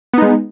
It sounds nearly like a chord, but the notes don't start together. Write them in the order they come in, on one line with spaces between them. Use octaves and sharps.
B3 D#4 G#3